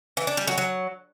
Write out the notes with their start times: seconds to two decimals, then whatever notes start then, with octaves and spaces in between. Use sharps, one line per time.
0.17 E3
0.27 D4
0.37 G3
0.47 F#3
0.58 F#3